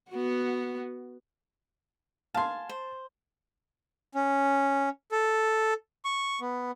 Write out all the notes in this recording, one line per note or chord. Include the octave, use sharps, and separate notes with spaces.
B3 F#4
F5 G#5 A5 C6
C5
C#4
A4
C#6
B3